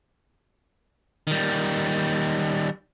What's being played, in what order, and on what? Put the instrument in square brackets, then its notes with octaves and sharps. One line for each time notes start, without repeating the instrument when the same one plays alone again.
[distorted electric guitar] D#3 G3